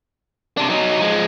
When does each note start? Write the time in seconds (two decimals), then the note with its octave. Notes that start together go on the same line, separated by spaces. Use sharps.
0.57 C3 D4
0.70 F#3 D#4
1.01 F3 G#3